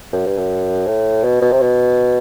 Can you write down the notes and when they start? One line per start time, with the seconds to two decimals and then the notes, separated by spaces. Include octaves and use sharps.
0.13 F#2
0.26 G2
0.37 F#2
0.87 A2
1.24 B2
1.42 B2
1.51 C3
1.60 B2